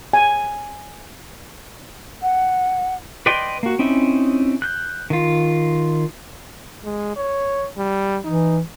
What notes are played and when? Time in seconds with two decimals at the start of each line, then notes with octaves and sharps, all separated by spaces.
0.13 G#5
2.22 F#5
3.26 B4 D5 D#5 G5 C6
3.63 A#3 F#4
3.79 C4 C#4 D#4 E4
4.62 F#6 G6
5.10 D#3 F4
6.84 G#3
7.16 C#5
7.77 G3
8.24 E3 D#4